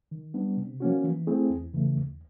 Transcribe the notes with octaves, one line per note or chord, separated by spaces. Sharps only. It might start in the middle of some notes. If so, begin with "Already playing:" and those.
D#3
G3 B3 D4
C3
F3 A#3 C#4 F#4
E3
A3 C4 E4 G#4
E2
C#3 E3 A3
D#2